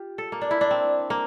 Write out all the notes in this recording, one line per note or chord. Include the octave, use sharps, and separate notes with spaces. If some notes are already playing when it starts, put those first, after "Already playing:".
Already playing: F4 G4
A4
A#3
D4
E4
D4
C4
A#3